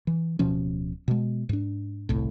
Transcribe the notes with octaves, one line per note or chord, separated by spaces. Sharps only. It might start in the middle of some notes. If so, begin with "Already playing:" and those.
E3
D1 B2 F3 C#4
B2 G#3
G#2 D4
G1 C2 A2